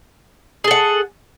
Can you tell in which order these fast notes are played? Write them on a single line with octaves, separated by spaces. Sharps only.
G#4 A4 F#5